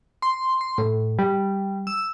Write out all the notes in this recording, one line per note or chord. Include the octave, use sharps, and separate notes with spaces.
C6
C6
A2
G3
E6